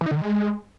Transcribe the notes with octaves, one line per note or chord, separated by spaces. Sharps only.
E3
D#4
D3
D#3
G#3